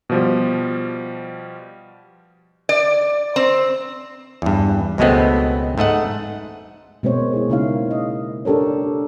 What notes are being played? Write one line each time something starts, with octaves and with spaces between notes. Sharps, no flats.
B2 F3 G3
D5
C4
E2 G2
C#2 B2 G#3 A3 B3 C4
G#2 A3 D#5 F#5
B2 G#3 A#3 C4 C5 C#5
E4 G#4
C#3 A#3 D#4 E4 C#5 F5
D#5
D4 G4 A4 A#4 C#5